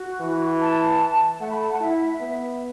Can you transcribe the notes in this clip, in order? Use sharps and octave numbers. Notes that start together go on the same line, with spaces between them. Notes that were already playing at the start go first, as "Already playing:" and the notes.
Already playing: F#4
E3
A5
A3 F#5
B5
A5
F#5
E4 E5
B3